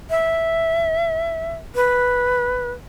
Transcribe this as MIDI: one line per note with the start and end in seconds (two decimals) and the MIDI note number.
0.10 1.52 76
1.75 2.71 71